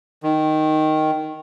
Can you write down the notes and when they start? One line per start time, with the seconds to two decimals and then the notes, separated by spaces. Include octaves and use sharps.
0.23 D#3